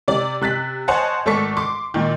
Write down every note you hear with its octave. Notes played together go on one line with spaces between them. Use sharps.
C3 D5
C3 F#6 A6 B6
C5 C#5 D#5 F#5 G#5 A5
G#1 A3 A4 D5 C#6 B6
C6 D6
A#2 D#3